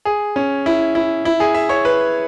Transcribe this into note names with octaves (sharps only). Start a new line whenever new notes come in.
G#4
C#4
E4
E4
E4
G#4
E5
C#5
B4